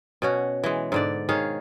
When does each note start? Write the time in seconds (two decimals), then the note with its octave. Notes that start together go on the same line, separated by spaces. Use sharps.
0.22 B2 C#4 F#4
0.64 E3 G#3
0.92 G#2 D3 D5
1.29 D#3 G#4 C#5 F5